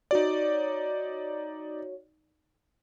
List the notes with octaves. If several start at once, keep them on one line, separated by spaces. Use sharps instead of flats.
D#4 F#4 C#5 D5